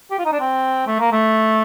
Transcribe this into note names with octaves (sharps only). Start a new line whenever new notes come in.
G4
F4
D#4
D4
C4
A3
A#3
A3